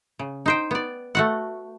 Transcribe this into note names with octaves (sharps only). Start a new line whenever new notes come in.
C#3
D#4 C5 G5
B3 D5
A3 F#4 F#5